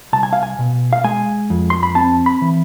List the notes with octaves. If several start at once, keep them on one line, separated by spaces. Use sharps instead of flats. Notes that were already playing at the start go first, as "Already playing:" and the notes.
C2 A5
G#5
F5
G#5
B2
F5
G#3 G#5
F2
C6
B5
C4 A5
B5
E3